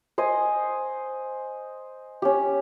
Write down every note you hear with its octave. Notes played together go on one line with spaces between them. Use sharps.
C5 D#5 G#5
C#4 G4